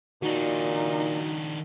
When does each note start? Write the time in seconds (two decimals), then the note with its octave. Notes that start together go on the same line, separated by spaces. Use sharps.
0.22 A#2 D#3 D4 D#4 F#4